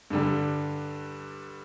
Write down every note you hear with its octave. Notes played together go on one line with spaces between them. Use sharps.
G2 D3 G3